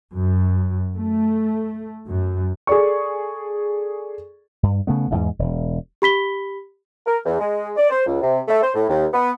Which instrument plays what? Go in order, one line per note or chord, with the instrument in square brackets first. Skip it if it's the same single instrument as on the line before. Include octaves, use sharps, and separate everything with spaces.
[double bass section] F#2
A3
F#2
[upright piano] G#4 A4 D5 C#6
[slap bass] G2
C#3 A3 B3
A1 E2 G#2
E1
[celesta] G4 B5 B6 G7
[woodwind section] A#4
E2
G#3
D5
C5
C#2
C3
A3
C5
A2
D#2
B3